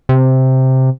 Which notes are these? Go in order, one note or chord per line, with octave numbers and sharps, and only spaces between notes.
C3